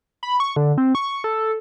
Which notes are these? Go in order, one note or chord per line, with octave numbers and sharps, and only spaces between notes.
B5
C#6
D3
C4
C#6
A4